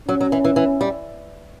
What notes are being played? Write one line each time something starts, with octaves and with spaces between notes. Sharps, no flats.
F#3 C#4
F#3
E3
E3
E3
G3